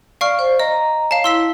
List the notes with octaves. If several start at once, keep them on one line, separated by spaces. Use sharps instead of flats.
D5 F5 C#6 F6
C5
D#5 A#5
C#5 F5 A5
E4 C6 E6 B6